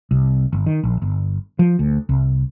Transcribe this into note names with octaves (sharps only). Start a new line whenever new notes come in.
C2
G1
D#3
A#1
G1
F3
D2
C2